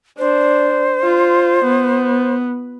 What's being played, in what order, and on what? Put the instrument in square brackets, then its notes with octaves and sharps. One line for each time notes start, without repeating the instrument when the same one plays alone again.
[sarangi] D4 [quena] C5
[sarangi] F4
B3